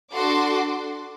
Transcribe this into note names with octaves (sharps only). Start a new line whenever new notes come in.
D4 F#4 A4 C6 D6